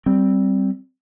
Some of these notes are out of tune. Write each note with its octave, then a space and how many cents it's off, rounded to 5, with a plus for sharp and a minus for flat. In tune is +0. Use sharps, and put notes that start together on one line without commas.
G3 -15 C4 +0